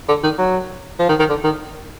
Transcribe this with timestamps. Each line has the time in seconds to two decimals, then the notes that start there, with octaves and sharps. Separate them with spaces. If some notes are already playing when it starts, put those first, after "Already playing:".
0.09 D3
0.24 D#3
0.38 F#3
0.99 F3
1.09 D#3
1.20 D#3
1.29 D3
1.44 D#3